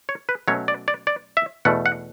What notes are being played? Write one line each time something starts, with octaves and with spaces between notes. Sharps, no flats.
C#5
B4
B2 F#3 A3 C#4 C#5
D5
D5
D5
E5
E2 B2 A3 F#5
F#5